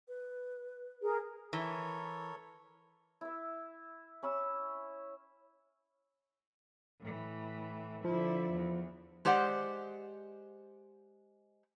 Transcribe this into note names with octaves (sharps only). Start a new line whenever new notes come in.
B4
G#4 A#4
E3 A4 A#4 C#5
E4 E5
C#4 B5 E6
A2 E3
D3 F3 E4
E2
G#3 G4 C5 D5 F#5